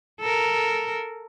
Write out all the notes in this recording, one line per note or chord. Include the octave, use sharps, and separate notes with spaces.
A4 A#4